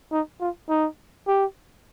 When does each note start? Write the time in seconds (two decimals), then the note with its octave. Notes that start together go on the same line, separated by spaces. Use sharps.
0.12 D#4
0.41 F4
0.69 D#4
1.28 G4